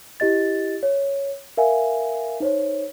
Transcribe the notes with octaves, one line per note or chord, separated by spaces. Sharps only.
E4 G4 D#5 A6
C#5
A#4 E5 F5 G#5
D#4 C5 C#5